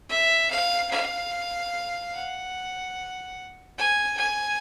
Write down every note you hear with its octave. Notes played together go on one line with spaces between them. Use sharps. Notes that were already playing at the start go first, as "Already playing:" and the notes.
E5
F5
F5
F#5
G#5
G#5